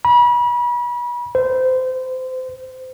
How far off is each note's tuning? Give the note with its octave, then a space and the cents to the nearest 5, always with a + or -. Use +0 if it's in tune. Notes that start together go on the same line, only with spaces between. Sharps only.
B5 -35
C5 -25